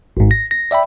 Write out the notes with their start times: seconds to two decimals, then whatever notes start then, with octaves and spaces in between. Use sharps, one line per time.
0.17 G#1 G#2
0.31 A#6
0.51 A#6
0.71 D5 E5 G5 B5